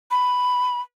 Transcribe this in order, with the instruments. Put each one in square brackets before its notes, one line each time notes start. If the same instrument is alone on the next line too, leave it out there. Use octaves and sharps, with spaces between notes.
[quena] B5